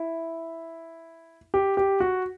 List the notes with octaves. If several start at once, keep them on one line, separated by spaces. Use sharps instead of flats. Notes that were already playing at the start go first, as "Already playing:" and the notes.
Already playing: E4
G4
G4
F#4